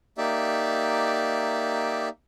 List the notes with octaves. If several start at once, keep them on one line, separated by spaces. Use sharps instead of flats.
A#3 D#4 G4 D5 E5